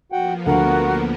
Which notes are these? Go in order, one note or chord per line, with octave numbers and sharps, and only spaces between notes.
F3 A#3 B3 F#4 F#5 G5
D2 F#4 A#4 F#5